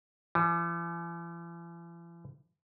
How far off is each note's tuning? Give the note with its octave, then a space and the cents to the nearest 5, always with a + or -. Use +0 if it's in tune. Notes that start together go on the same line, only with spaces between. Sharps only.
E3 +45